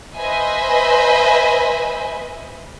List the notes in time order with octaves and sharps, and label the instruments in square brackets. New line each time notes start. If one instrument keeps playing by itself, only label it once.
[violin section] B4 C5 D#5 E5 G#5 B5